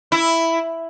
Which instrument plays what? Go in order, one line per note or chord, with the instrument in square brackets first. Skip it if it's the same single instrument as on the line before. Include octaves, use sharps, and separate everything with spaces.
[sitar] E4